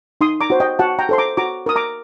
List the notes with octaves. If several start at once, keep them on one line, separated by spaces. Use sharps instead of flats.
D#4 C6 D#6
A#5 D6
F#4 C5
D#5 G5
F#4 F#5 A5
G5 A#5
A4 C5 C6
A#5 D6
F#4 A#5 D6
A#4 D#6
A#5 D6